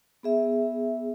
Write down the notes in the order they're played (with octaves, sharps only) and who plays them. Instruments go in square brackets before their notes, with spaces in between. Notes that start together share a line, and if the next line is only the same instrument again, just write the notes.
[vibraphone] B3 G#4 E5